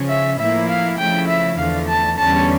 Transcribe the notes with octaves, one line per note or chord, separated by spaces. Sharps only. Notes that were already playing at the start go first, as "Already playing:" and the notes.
Already playing: C#3 F3 C#4
E5
A2 F3 A#3 E4 E5
F5
C#3 F3 A3 E4 G5
E5
E2 D3 F3 A3 F5
A5
E2 D3 G3 C#4 A5